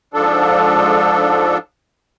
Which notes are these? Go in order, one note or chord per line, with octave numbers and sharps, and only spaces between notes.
G#2 F3 D4 A4